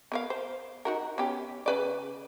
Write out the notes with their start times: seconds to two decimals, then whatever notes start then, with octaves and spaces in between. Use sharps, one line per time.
0.12 B3 A#4 F5
0.30 C5
0.85 D#4 F#4 A#4
1.18 B3 C#4 G4
1.66 C#3 B4 D5